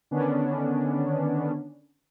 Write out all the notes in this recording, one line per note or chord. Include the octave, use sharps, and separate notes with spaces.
D3 D#3 B3 C#4 D4